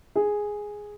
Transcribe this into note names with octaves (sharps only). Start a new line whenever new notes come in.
G#4